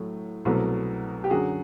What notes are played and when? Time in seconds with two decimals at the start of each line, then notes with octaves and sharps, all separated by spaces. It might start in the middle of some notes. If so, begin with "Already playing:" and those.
Already playing: A2 F#3 A3
0.45 C2 B2 F#3 A3
1.24 G4
1.30 F#2 D3 F#3 F#4 G#4